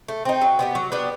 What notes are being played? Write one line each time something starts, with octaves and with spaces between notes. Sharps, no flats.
A3
C4 D#4
F#3
B3 D4 G4
F#3
B3 D4 G4